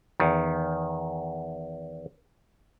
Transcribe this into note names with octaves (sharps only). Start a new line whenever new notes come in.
E2 D#3